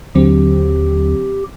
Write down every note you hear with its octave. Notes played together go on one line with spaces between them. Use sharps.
D#2 D3 F#3 C4 G4